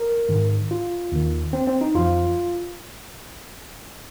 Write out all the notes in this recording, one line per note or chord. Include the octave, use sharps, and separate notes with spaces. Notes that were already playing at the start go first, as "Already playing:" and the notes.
Already playing: A#4
G#2 D#3
F4
D#2 D#3
C4
C4
D#4
F2 F3 F4